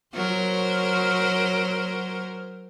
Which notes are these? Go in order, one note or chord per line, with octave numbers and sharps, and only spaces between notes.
F#3 A#4 C5